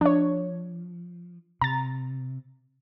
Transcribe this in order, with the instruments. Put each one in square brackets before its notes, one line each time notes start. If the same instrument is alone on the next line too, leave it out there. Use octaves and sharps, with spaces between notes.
[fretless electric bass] F3 [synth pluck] D4 C#5
[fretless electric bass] C3 [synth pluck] A#5 A6